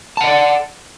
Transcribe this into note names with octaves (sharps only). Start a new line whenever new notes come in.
D5 D#5 F#5 A5